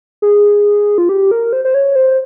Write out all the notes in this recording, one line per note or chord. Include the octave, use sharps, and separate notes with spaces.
G#4
F4
G4
A#4
C5
C5
C#5
C5